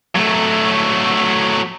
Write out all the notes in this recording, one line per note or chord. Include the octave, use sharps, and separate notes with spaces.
F#3 A3